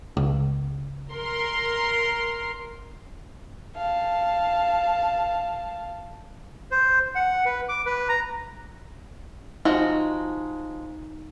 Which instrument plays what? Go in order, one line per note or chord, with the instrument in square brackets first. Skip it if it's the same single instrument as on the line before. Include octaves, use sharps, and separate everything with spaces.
[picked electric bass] C#2
[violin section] A#4 C6
[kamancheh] F5 A5
[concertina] C5
F#5
B4
D6
B4
A#5
[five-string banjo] F3 G#3 F#4 [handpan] D#4